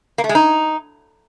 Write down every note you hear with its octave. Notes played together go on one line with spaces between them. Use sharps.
A#3
A3
G#3
D#4